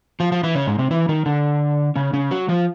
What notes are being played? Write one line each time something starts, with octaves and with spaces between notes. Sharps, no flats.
F3 F4
F3 F4
E3 E4
C#3 C#4
G#2 G#3
C3 C4
E3 E4
D#3 D#4
D3 D4
C#3 C#4
C#3 C#4
F#3 F#4
F3 F4